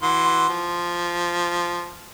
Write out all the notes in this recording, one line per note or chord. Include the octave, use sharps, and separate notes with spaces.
E3 F#4 C6
F3